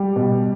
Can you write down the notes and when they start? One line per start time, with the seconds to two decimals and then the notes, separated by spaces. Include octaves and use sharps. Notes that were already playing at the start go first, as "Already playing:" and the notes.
Already playing: G3
0.16 B2